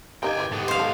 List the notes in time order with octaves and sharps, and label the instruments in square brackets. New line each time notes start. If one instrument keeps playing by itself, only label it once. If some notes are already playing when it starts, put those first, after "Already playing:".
[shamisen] A#3 D#4 [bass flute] G4 [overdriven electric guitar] G5 G#5
[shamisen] E3 G#3
[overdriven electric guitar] G#2 B3 [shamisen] A3
[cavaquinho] C5 F5
[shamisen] A4